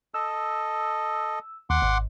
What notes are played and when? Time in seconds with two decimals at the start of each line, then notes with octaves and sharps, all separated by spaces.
0.14 A4 D#5 E6
1.70 D#2 F#5 C6 D6
1.82 G#1